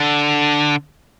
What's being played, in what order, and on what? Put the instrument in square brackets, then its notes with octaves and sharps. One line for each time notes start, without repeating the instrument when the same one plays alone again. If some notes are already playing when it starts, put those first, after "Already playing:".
Already playing: [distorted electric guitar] D3